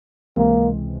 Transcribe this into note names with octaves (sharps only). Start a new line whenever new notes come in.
C#2 C3 E3 G#3 A#3 C4